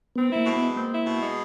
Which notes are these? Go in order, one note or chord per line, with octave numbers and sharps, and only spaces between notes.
B3 C4
A#3 E4
B2
B3
G#3
A#3 C4
E4
B2
G#3